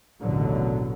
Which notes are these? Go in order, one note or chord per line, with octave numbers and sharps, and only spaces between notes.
A1 D#2 B2 D3 F#3